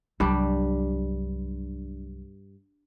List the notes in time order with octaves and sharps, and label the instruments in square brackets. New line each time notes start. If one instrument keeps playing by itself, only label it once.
[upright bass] C2 F#3 [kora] G2 G3 D4